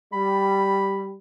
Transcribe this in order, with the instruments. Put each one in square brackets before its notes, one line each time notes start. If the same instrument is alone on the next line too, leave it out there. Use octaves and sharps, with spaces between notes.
[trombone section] G3 [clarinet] B5